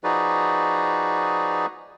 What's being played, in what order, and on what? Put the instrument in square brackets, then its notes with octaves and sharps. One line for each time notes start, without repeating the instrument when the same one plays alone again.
[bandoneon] F3 D#4 F#4 G#4 B4 D5